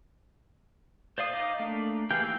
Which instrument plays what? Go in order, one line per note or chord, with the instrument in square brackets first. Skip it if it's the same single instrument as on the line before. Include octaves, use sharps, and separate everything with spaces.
[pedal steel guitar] C5 D5 F5 D#6
D#4 D#5 F5 D6
A3 A#3 D4
E3 G4 G#4 F5 G5
D#3 F#3 E6 G6